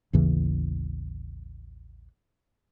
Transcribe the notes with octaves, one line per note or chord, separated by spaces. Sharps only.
A1 D#2 C#3 E3